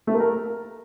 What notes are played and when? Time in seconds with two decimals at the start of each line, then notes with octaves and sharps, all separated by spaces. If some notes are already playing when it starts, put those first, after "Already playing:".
0.07 A3
0.14 A#3
0.20 A#4